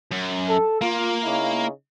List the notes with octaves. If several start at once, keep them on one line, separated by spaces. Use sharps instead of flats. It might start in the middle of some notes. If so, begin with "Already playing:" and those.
F#2
A4
A#3 F4
C#3 D#4 E4